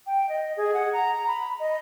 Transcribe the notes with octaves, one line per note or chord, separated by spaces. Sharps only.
G5
D#5
G#4
F#5
A#5
B5
D#5